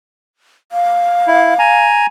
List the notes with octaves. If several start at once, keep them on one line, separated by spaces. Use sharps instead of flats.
F5
E4
G#5 A#5